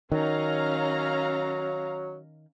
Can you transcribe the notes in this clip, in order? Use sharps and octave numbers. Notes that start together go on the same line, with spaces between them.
D#3 F#3 C#4 F5 A#5